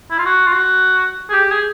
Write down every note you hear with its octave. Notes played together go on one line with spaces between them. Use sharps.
E4
F4
F#4
F4
F#4
G#4
G4
G#4